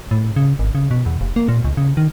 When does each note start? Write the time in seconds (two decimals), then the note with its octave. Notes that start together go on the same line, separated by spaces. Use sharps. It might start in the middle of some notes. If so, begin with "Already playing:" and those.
0.11 A2
0.36 C#3
0.59 G#1
0.75 C#3
0.91 B2
1.06 E2
1.21 F1
1.36 A#3
1.48 A#2
1.65 C#2
1.77 C#3
1.97 D#3